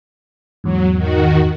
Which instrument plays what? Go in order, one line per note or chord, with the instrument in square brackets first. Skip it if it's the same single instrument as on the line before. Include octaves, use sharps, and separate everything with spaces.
[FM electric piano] E2 G#2 [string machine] F#3
[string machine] D#3 F#4